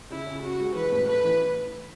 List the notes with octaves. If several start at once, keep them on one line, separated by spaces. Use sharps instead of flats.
C#3 E4
C#3
C#3 F#4
G#3
E3 B4
A2
A3 B4
E3